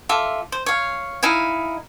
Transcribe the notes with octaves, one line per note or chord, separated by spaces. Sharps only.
F4 A4 E5 D6
C5
C#5 F5
D#4 E4 F5 G#5